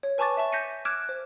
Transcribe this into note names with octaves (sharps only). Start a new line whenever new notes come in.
C#5
B4 G#5 A5 C#6 D6 A6
E5 A5 C#6
G6 A#6 B6 C#7 D#7
D6 F6 F#6 G#6 D7 E7
C5